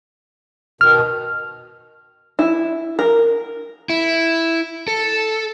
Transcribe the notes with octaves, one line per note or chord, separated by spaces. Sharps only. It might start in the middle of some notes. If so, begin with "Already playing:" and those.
B2 D#3 F6
E4
A#4
E4
A4